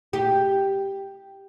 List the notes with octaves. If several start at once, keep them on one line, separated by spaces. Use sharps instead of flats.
G4